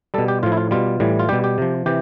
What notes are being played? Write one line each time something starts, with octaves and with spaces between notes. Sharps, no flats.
B2 G3 A4
G4
A2 F3 F4
E4
F4
B2 G3 F4
A2 E3 G3
F4
B2 G3 G4
G4
C3 F3
C3 E3 G4